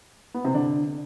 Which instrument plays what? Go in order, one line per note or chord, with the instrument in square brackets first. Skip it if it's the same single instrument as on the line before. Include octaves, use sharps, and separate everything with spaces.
[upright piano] B3
C3 C4
D3 D4